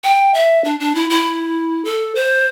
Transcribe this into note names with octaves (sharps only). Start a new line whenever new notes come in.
G5
E5
D4
D4
E4
E4
A4
C5